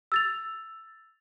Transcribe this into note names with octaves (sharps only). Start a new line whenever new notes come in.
E6 A6 F7